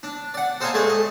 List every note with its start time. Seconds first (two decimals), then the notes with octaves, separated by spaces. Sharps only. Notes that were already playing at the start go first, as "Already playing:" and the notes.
0.03 D4
0.34 D5 F#5
0.60 A4 C5 D#5 F5 G#5 A#5
0.74 G#3 A3 D5 D#5
0.89 D#5